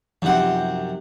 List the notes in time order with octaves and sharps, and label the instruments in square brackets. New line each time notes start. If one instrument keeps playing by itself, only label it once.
[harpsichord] F#2 C3 F#5 [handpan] F3 D#4 G4